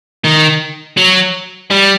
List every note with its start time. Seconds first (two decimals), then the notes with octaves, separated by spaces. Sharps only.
0.24 D#3
0.97 F#3
1.71 G3